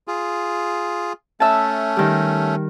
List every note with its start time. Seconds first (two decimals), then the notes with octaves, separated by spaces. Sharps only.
0.08 F4 G#4
1.40 A3 C#4 E5 A5
1.96 D#3 G3